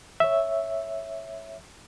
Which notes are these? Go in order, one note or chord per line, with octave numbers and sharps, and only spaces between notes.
C#5 E5